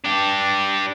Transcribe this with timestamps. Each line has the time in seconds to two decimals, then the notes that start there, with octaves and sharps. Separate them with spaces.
0.05 D4 G4